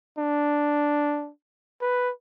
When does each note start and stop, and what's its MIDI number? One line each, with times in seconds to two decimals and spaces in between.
0.18 1.30 62
1.81 2.11 71